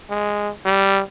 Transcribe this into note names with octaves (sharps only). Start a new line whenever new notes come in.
G#3
G3